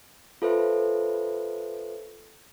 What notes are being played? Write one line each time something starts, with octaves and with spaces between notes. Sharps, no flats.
F4 A4 B4 C5 E5